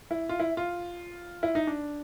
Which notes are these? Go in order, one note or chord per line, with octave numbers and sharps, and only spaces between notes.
E4
F4
E4
F4
E4
D#4
D4